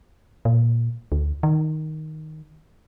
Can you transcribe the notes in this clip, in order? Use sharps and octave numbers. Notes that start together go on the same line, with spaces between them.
A#2
D2
D#3